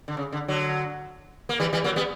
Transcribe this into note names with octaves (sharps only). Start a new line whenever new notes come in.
D3
C#3
D3
D3 F#3
A#3
E3 G3
E3 G3
F#3 A#3
G3 B3